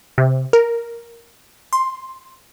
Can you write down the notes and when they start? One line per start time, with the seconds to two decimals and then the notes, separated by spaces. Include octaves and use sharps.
0.18 C3
0.53 A#4
1.73 C6